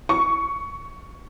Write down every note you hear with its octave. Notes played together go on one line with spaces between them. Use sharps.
C#6